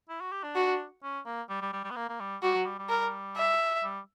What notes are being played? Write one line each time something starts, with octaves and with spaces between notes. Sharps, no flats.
E4
F#4
G4
D4
F#4
C#4
A#3
G3
G3
G3
G3
B3
A#3
A#3
G3
G3 F#4
F#3
G3
G3
A#4
E5
G3